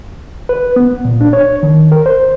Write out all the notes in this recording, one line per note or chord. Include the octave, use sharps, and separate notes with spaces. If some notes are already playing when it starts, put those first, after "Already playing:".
B4
B3
A#2
D4
C#5
D#3
A#4
C5